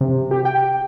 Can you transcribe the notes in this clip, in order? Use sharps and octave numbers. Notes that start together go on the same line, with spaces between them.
C3
G4
G5